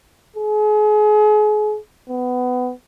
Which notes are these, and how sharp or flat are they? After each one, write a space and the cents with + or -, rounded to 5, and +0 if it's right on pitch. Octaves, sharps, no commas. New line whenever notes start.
G#4 +35
B3 +20